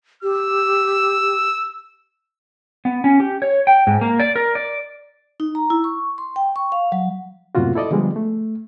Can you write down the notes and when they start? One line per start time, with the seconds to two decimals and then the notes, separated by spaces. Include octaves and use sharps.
0.23 G4 E6
2.85 B3
3.04 C#4
3.20 G4
3.42 C#5
3.67 G5
3.87 G#2
4.01 A#3
4.20 D5
4.36 A#4
4.55 D5
5.40 D#4
5.55 A#5
5.70 E4
5.84 C#6
6.18 C6
6.36 G5
6.56 C#6
6.72 F5
6.92 F#3
7.55 F#2 A2 C3 A#3 F4 F#4
7.75 E4 A4 D5 D#5
7.91 D3 F3 G3 G#3 B3
8.16 A3